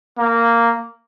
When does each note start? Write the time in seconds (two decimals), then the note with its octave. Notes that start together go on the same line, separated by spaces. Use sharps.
0.19 A#3